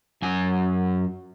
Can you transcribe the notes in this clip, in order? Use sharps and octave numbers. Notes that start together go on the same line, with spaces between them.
F#2 G#5